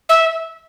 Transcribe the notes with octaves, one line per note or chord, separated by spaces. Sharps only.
E5